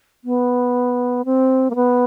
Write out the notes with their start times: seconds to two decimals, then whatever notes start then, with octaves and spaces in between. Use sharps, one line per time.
0.24 B3
1.25 C4
1.70 A#3
1.75 B3